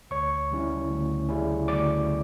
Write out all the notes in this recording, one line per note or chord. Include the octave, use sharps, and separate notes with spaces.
D2 C#5 C#6
C#3 G3 C#4 E4
D2
C#3 G3 C#4 E4
D2 D5 D6